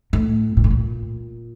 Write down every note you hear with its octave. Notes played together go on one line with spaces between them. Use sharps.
A2
A#2
A2
A#2